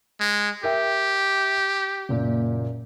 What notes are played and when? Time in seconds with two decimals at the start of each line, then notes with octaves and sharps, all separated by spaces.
0.20 G#3
0.64 G4 A#4 E5 G5
2.09 F#1 A#2